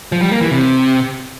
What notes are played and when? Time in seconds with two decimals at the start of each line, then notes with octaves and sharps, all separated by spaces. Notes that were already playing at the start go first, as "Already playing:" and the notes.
0.12 F3
0.22 G3
0.31 A#3
0.41 E3
0.51 C3